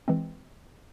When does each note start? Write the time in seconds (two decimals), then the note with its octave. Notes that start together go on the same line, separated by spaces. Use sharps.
0.08 E3 G#3 C4